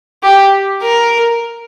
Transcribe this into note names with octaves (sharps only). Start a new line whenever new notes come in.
G4
A#4